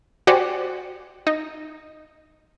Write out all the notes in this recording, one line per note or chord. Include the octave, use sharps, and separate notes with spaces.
F#4 G4 C5 D5 F#5 G#5
D#4